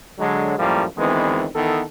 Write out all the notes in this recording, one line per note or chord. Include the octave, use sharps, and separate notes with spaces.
D3 F#3 G#3
F#2 A2 F3 G3 A#3
D2 D#3 E3 G#3 B3 C4
D#3 E3 B3 A4